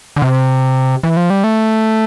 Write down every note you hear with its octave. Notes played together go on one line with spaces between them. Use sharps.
D3
C3
E3
F3
G3
A3